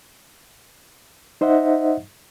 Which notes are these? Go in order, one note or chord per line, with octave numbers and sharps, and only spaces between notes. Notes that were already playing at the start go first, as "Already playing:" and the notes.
D#4 C5 D#5 E5 F#5